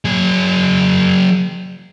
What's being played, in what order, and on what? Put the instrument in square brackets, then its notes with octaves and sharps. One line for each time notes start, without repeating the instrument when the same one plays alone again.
[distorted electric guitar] F#3 G#4